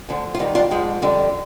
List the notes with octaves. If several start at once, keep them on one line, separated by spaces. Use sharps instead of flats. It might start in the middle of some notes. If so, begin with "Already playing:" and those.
D2 D3 F3
F4
G#2 D#3 G3 C4 D#4
D4 F4
G#2 F3 G#3
F2 D3 G3